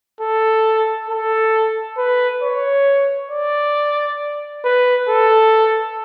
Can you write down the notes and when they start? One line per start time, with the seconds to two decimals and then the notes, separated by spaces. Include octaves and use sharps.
0.21 A4
1.10 A4
1.98 B4
2.43 C#5
3.31 D5
4.65 B4
5.09 A4